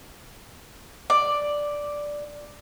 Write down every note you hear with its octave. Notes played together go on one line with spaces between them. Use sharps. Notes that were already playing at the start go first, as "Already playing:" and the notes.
D5